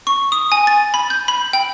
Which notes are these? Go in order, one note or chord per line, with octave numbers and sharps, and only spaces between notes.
C#6
D#6
G#5
A6
B5
G6
B5
G5